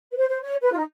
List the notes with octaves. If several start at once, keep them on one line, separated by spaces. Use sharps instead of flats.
B4
C5
C5
C#5
B4
F4
D#4